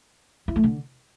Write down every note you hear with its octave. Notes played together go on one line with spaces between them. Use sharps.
E4
A3
D3